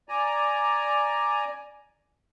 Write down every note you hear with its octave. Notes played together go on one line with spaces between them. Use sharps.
D5 G#5 A#5